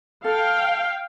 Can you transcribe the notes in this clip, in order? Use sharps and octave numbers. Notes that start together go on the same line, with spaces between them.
A4 F5 G5